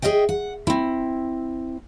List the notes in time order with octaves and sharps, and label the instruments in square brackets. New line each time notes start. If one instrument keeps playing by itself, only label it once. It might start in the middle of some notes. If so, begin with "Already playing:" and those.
[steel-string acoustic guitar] G#4 A#4 D#5 E5 G5
F#5
C4 E4